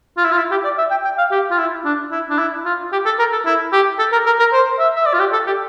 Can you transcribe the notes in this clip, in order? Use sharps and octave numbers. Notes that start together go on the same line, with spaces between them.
F4
E4
F4
E4
G4
D5
E5
G5
G5
F5
G4
F4
E4
D4
E4
D4
E4
F4
G4
A4
A#4
A4
E4
G4
A4
A#4
A#4
A#4
C5
E5
E5
D5
F4
G4
A4
G4